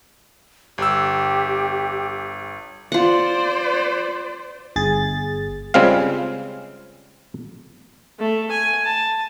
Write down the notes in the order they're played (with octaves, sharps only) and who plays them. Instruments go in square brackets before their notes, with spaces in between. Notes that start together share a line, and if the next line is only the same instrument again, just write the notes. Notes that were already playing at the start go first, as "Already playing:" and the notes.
[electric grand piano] G1 E6 [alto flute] G4
[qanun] F4 F#5 [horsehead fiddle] C5 D5
[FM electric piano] G1 G#4 A6
[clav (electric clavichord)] C#3 G3 G#3 C4 F4 F5
[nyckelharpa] A3
G#5
A5